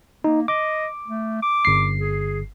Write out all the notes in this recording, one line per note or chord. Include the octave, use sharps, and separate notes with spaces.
A#3 D#4
D#5 D6
A3
D6
G1 C7
G#4